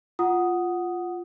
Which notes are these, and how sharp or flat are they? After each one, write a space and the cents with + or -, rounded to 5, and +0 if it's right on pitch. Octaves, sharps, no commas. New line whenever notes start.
F4 +0 F#5 +0 D#6 +0